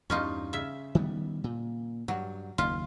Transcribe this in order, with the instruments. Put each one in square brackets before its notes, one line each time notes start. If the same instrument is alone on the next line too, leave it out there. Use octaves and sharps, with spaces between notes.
[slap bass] E2 G2 [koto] C#4 D#4 F4
[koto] C#3 E5
[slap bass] D#3 G3 B3
A#2
[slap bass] G2 [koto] F#3
[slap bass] F#1 D#2 [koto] F4